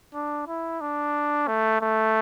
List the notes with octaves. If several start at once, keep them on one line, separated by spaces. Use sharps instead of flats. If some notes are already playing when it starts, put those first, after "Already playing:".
D4
E4
D4
A3
A3